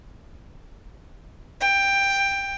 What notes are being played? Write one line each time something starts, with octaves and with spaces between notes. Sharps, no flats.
G5